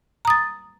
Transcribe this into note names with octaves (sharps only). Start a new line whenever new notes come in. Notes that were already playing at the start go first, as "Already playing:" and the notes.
A#5 D#6 A6